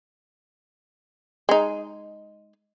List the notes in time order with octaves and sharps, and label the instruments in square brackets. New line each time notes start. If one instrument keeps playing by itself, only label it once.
[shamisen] G#3 D#4